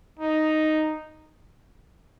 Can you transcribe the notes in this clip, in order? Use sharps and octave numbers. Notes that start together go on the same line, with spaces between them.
D#4